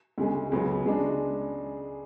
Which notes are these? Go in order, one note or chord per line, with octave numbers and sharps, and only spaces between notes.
D2 C#3 G#3
C#2 C#3 F#3 B3
C#3 G#3 D4